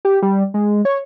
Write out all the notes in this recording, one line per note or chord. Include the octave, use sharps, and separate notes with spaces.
G4
G3
G#3
C#5